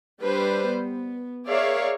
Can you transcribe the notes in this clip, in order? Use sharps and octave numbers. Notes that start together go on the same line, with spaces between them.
G3 D4 B4 C5
B3
G#4 A#4 C#5 D5 E5 F5